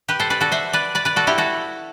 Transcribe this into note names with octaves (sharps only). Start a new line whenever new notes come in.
G4 B4
A4 C5
B4 D5
F#4 A4
C5 E5
B4 D5
B4 D5
B4 D5
F#4 A4
E4 G4
F#4 A4